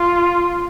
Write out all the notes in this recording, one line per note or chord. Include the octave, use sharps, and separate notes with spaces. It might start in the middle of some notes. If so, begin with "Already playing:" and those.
Already playing: F4